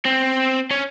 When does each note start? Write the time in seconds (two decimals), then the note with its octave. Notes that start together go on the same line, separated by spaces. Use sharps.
0.05 C4
0.71 C#4